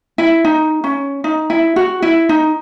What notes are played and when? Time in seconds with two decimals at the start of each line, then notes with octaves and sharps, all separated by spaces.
0.18 E4
0.44 D#4
0.84 C#4
1.24 D#4
1.50 E4
1.76 F#4
2.02 E4
2.29 D#4